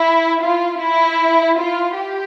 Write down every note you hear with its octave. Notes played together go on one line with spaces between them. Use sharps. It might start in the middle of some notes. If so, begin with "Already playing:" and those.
Already playing: E4
F4
E4
F4
G4